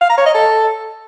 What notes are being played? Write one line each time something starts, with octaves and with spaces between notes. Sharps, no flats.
F5
A#5
C#5
D#5
A4